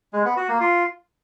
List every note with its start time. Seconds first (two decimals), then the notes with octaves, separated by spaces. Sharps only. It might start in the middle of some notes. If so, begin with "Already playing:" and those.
0.13 G#3
0.25 B3
0.37 F#4
0.49 A#3
0.60 F4